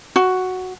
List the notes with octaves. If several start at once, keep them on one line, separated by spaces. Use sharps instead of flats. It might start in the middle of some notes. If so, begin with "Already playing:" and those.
F#4